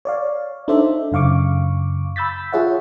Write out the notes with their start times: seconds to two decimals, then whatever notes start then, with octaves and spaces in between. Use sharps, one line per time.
0.05 C#5 D5 F5
0.68 D4 D#4 A4 C5 D5 E5
1.12 F#2 C#3 F5 C#6 D6
2.16 B5 E6 G6 A6 B6
2.52 F4 G#4 C#5 E5 F#5